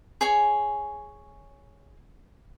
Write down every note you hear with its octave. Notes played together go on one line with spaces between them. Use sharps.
G#4 C#5 G#5